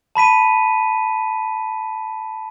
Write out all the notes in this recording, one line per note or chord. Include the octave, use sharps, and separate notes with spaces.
A5 B5 B6 D#7